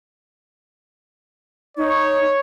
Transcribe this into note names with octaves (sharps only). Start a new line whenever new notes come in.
D#4 C#5